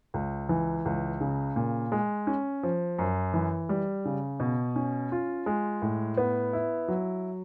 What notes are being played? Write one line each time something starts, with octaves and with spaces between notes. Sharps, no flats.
C#2
E3
C#2
C#3
A#2
G#3
C#4
F3
F#2
E3
G3
C#3
B2
C#4
F4
G#3
A2
B3
E4
F#3